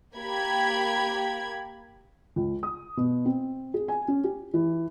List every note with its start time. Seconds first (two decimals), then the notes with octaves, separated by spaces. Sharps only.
0.16 A#3 G4 B5 G#6
2.36 C#2
2.63 D#6
2.97 B2
3.25 C4
3.74 G#4
3.88 G#5
4.08 C#4
4.24 G4
4.54 E3